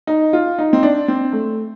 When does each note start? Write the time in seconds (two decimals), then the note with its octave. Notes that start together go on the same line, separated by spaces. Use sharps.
0.07 D#4
0.33 F4
0.58 D#4
0.73 C4
0.83 D4
1.08 C4
1.33 A3